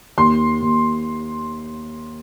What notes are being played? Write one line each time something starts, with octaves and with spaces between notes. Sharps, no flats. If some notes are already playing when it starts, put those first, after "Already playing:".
D#2 C6
D#2